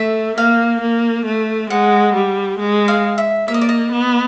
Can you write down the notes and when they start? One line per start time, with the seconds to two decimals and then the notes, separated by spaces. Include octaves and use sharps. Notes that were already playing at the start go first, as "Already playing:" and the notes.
Already playing: A3 E5
0.37 A#3 F5
0.81 A#3
1.25 A3
1.70 G#3 F#5
2.14 G3
2.59 G#3
2.88 F5
3.18 E5
3.48 A#3 E5
3.54 D#5
3.61 D5
3.69 D#5
3.92 B3